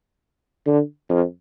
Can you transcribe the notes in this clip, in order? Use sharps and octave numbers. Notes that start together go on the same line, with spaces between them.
D3
F2